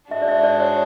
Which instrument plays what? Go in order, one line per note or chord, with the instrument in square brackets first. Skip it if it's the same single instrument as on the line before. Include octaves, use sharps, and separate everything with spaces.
[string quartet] G#2 G#3 D4 F#4 [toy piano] E5
[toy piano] D5
E5
D5
C#5